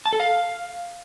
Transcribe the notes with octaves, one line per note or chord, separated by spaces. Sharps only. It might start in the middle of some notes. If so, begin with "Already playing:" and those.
A5
A4
F5